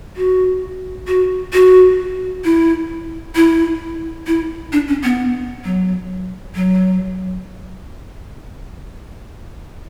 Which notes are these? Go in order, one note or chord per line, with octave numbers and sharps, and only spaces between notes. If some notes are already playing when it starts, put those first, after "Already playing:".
F#4
F#4
F#4
E4
E4
E4
D4
C#4
B3
F#3
F#3